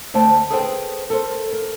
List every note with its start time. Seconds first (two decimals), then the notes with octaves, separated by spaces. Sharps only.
0.14 D2 A3 C5 G5 A5
0.50 G#4 A4 B4 C5 F5 G5
1.10 A4 A#4 C5
1.53 A#4